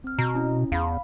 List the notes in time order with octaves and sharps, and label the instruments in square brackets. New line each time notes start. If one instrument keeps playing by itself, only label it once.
[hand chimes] C4 F6
[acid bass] B2 [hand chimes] A#5
[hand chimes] C#4 E4
[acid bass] E2 [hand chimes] F5 B5